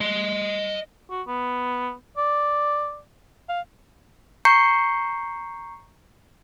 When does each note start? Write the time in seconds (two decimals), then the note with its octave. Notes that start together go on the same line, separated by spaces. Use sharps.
0.01 D#5 C6
1.10 F#4
1.27 B3
2.17 D5
3.49 F5
4.45 A#5 C#6 G6 C7 C#7